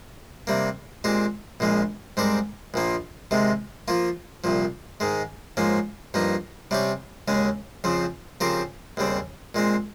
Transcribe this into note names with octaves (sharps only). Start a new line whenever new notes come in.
C3 G3 A#3
A#2 G#3 C4 G4
A#1 A#2 F3 G#3
G#2 G3 C4 G4 A#4
A#1 A#2 F3 A#3
C3 D#3 G#3
F3 A#3 F4
C2 A#2 F3
G#2 D#3 G#3
G#2 F3 A#3 C#4
G2 F3 A#3 D#4
C3 G3 C#4 G4 C#5
D#2 C#3 G#3 C#4
F2 C#3 F3 C4
C#3 F3 C4 G4 A#4
D#2 C#3 G3 C4
A#2 G#3 C4